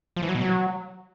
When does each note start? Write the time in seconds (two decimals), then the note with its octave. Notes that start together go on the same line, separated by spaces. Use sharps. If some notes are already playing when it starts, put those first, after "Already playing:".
0.16 F3
0.23 E3
0.29 F#3
0.35 B2
0.41 F#3